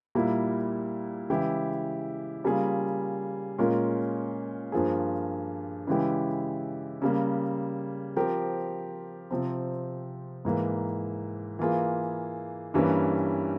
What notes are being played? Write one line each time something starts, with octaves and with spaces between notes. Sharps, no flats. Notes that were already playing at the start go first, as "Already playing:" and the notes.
A#2 G3 A#3 E4
C#3 E3 G#3 E4 G4
C#3 G3 A#3 F4 G#4
A#2 G#3 C#4 F4 A#4
G2 F3 A#3 F4 G#4
C#3 E3 G#3 E4 G4
C#3 G3 A#3
F3 C4 G4 A#4
C3 F3 C4
G#2 E3 A#3
E3 A#3 F4 G#4
G2 E3 G3 A#3 C#4